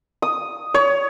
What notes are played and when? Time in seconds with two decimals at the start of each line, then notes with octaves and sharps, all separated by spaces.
0.22 D#6
0.74 C#5